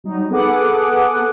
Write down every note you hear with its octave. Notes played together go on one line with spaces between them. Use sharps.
F#3 G3 D#4
B3 G#4 A4 F#5 D6 D#6